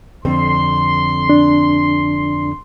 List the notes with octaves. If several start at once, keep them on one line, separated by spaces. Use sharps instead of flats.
F2 D3 C4 C6
D4